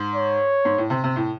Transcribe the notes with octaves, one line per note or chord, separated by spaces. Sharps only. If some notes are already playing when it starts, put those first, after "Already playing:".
Already playing: G#2
C#5
G#2
A2
C3
C3
A2